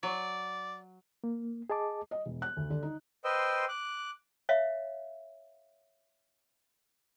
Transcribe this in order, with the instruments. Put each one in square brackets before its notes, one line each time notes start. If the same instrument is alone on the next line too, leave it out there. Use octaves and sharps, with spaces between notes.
[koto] F#3 [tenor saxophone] D5
[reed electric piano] A#3
G#4 D#5 A5 D6
[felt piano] D#5
E1
F#6
D2
D3
D#4
[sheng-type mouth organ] B4 C5 D#5 G5 C6 E6
D6 F#6
[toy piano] C#5 E5 F5